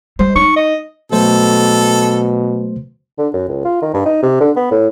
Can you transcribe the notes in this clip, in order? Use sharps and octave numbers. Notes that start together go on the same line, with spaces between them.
G3 C5
D#4 C#6
D#5
B2 F#3 A3 A4 C5
D3
F#2
C#2
F4
D#3
G2
D#4
C3
D3
B3
A2